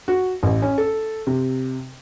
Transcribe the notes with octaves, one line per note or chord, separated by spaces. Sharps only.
F#4
A1
C#4
A4
C3